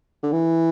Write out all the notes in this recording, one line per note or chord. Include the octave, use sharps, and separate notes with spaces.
D3
E3